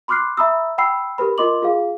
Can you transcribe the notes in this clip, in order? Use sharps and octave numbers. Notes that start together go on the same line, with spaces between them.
B5 C6 D6 F6 F#6 C7
E5 A#5 B5 D#6 E6
F#5 G5 B5 E6 C7
G4 A#4 B4 B5
F4 A#4 D#5 C6 D6 F#7
F4 G#4 F5